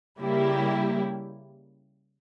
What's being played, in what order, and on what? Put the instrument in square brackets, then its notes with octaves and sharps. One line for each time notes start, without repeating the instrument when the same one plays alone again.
[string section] C#3 G3 A#3 E4 G4